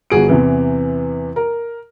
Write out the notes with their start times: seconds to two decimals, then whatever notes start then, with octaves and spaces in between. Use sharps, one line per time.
0.10 G1 F#4 G#4 D7
0.29 E2 C3 E3
1.36 A#4